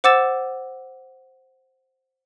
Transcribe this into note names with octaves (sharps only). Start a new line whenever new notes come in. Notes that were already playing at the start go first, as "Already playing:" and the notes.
C5 F#5 D6 E6 A6 E7